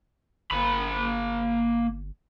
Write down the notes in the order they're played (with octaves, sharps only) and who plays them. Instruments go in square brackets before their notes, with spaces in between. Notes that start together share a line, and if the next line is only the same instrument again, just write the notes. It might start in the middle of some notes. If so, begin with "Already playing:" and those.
[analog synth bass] G1 [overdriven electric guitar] A#3 B5